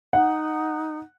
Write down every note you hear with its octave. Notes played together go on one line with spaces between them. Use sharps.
D#4 F#5